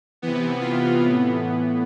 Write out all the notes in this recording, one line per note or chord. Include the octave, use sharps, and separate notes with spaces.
C3 E3 B3
F4
A2 E3 B3